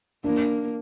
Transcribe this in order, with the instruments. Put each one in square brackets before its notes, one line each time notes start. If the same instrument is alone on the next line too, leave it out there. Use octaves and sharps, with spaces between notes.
[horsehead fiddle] A#3 [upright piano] D4